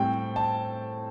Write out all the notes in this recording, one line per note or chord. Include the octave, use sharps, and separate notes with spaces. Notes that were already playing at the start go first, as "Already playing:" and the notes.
Already playing: A2 G3 C4 G5
A5